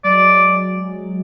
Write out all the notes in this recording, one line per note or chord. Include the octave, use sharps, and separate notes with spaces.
F#3 G#3 D5